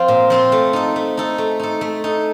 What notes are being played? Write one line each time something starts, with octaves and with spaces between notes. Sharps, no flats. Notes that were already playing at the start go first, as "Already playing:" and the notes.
Already playing: F3 C4 F4
A#2
F3 C4 F4
A3
D#4 A4
A3
D#4 A4
A3
D#4 A4
A3
D#4 A4